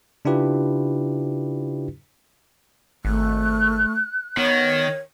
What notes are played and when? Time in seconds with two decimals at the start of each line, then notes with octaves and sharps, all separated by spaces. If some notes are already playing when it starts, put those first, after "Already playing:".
0.25 C#3 D4 E4 F4 G4 B4
3.05 G#1 A3 F#6
4.37 D#3 B3 C#5